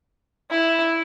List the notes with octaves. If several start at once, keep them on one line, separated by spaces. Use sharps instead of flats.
E4